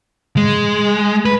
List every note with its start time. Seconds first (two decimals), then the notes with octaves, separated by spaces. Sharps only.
0.36 G#3
1.25 B4